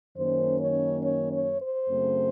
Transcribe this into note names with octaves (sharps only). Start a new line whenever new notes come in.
F#2 D#3 A#3 C#4 C5
C#5
C#5
C#5
C5
F#2 C#3 A3 C4